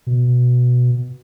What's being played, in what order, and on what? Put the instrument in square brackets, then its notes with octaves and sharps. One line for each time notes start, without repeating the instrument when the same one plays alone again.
[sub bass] B2